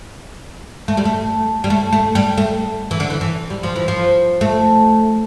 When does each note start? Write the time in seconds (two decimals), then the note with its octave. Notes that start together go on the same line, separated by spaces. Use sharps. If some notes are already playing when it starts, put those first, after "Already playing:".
0.88 A3
0.97 G3
1.05 A3
1.64 G3
1.70 A3
1.93 A3
2.15 G3
2.37 A3
2.91 E3
3.00 D3
3.10 E3
3.21 E3
3.50 G3
3.63 F3
3.76 E3
3.88 F3
4.41 A3